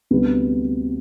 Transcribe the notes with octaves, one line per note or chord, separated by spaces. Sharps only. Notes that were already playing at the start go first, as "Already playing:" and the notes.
D2 C3 G3 B3